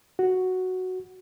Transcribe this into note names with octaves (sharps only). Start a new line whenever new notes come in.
F#4